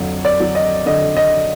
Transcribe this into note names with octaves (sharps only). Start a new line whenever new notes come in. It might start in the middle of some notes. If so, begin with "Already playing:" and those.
Already playing: F2 D3 F#3
D5
F#3
D#5
D3 D#5
D#5